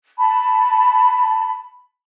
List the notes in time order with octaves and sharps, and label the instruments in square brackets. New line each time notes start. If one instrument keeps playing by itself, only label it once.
[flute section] A5 B5